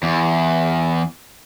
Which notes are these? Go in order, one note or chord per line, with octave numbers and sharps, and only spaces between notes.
E2